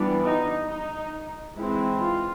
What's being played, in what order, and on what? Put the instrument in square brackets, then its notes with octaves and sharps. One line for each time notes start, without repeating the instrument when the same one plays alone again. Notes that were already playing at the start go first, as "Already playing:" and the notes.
Already playing: [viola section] E3 G3 B3 D4
D#4
D#4
E3 G#3 C4 E4
F4